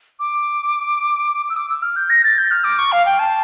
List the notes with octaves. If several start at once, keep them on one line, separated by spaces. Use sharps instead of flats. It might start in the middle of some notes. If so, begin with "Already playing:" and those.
D6
E6
D6
E6
F6
G6
A#6
A6
G6
F6
D6
C#6
F5
G5
A5